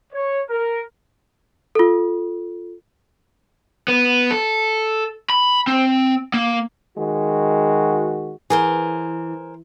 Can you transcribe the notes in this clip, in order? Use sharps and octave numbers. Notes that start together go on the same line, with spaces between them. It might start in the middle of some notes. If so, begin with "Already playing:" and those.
C#5
A#4
F4 A4
B3
A4
B5
C4
A#3
D#3 G#3 F#4
E3 G#4 A#4 C5